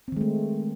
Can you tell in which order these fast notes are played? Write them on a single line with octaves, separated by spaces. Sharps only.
C4 D#3 G#3 A3